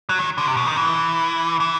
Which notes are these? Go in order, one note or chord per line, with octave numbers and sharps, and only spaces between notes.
F#3
D#3
D3
C3
B2
D#3
E3
E3